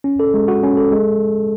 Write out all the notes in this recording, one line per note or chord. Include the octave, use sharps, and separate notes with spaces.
C#4
A4
G#3
F#4
C#4
A4
G#3